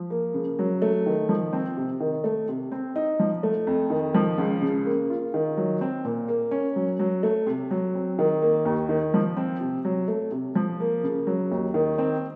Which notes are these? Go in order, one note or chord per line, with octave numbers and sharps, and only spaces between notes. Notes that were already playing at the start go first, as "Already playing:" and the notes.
Already playing: F3
A#3
C#3
F#3
A3
D#3
F3
C4
C3
D#3
A3
C3
C4
D#4
F3
A3
F2
D#3
F3
C#2
C#3
A#3
F4
D#3
F#3
C4
A#2
A#3
C#4
F#3
F#3
A3
C3
F#3
C4
D#3
A#3
D#2
D#3
F3
C4
C3
F#3
A3
C3
F3
A#3
C#3
F#3
D#2
D#3
C4